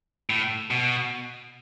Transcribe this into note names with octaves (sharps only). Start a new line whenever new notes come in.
A2
B2